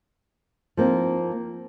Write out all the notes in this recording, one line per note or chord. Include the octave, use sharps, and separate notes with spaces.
F3 A#3 C4 D#4